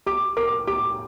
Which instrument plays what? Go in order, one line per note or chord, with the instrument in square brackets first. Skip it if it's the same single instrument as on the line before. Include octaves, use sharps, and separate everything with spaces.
[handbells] G4 [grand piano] D6
[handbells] A#4 [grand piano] D6
[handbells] G4 [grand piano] D6